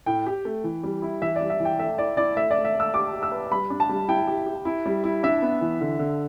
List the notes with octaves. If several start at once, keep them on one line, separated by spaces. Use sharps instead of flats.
A2 G5
G4
A3
E3
G3
E4
E3 E5
G3 D5
E5
E3
G5
A3 E5
E4 D5
E4 D5
A3 E5
D5
A3
E5
A3
E6
G4 D6
G4
E6
B4
G3 B5
D4
A5
G3
E4 G5
G4
G4
E4
G3
E4
D4 E5
B3
E3
D3
D3